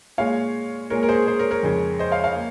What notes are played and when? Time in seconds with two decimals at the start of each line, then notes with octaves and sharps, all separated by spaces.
0.18 A#2 G#3 C#5 F5
0.90 A#2 G#3 A#4 C#5
1.03 A#4
1.09 G#4 C5
1.27 G#4 C5
1.39 A#4 C#5
1.51 A#4 C#5
1.63 F2 C#3 G#3
1.99 C5 D#5
2.11 C#5 F5
2.24 C#5 F5
2.35 A#3